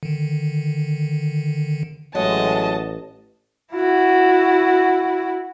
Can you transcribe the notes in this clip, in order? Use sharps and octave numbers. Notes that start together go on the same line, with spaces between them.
D3 D#3
A1 A2 F#3 G#3 D#5 A5
E4 F#4